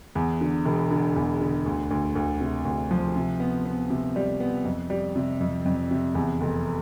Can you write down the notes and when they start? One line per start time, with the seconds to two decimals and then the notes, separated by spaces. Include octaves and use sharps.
0.15 E2
0.41 D3
0.65 E1
0.91 D3
1.16 E2
1.41 D3
1.66 D2
1.91 D2
2.16 D2
2.41 C3
2.65 D2
2.91 F3
3.16 C3
3.40 B3
3.65 B3
3.90 C3
4.16 G3
4.40 B3
4.65 F2
4.90 G3
5.16 C3
5.41 F2
5.65 F2
5.91 C3
6.15 E2
6.41 F1